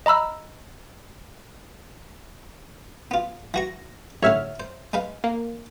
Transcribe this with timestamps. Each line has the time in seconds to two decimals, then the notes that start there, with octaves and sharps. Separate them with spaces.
0.06 D#5 A#5 B5 E6 F6
3.11 B3 F4
3.54 E3 F#4 C#6 A#6
4.23 A1 D3 C#5 E5 F6
4.60 C5
4.93 G#3 B4 F5
5.24 A#3